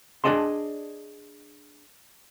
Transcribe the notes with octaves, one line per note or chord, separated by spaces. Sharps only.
D4 G#4 D5 D#5 A5 C6